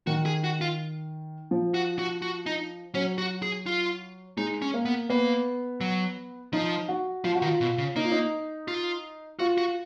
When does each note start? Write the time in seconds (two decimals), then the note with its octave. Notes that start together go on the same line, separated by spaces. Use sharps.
0.07 D#3 F#4
0.26 G#4
0.44 F#4
0.61 F4
1.51 F3
1.74 F#4
1.99 F#4
2.22 F#4
2.46 D#4
2.94 F#3 C#4
3.18 F#4
3.42 G#4
3.66 F4
4.38 G#3 D#4
4.62 C#4
4.74 A#3
4.85 B3
5.10 A#3 B3
5.81 F#3
6.53 F3 D#4
6.88 F#4
7.24 F3 F4
7.35 F#4
7.42 D#3
7.46 F4
7.61 B2
7.78 C#3
7.96 A#3 D#4
8.04 F4
8.12 D#4
8.68 F4
9.39 F4 F#4
9.58 F#4